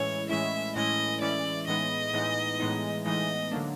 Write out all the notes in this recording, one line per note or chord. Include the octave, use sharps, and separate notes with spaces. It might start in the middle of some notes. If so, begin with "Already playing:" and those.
Already playing: A2 E3 G#3 C#4 E4 C#5
A2 E3 G#3 C#4 E4 E5
A2 E3 G#3 C#4 E4 D#5
A2 E3 G#3 C#4 E4 D5
A2 E3 G#3 B3 D#4 D#5
A2 E3 G#3 B3 D#4
A2 E3 G#3 B3 D#4
A2 E3 G#3 B3 D#4 D#5
D3 F#3 A#3 D4